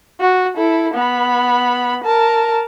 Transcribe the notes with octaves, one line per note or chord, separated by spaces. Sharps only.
F#4
E4 A4
B3 B5
A#4 A5